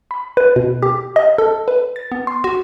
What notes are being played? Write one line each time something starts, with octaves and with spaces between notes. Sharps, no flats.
B5
B4
B2
G4
D#5
A4
B4
A6
B3
C6
F#4